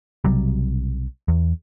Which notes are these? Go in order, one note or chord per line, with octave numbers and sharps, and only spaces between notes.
B1 C3 F#3 G3
E2